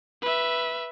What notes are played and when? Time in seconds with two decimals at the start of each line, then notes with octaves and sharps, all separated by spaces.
0.22 B4 E5